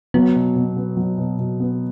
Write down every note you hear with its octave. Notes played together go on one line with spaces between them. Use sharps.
F#3 B3
B2
B2
B3
F#3
B2
B2
B3